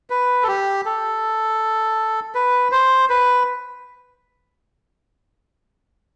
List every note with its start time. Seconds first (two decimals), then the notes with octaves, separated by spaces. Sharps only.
0.10 B4
0.43 A4
0.48 G4
0.85 A4
2.35 B4
2.72 C5
3.10 B4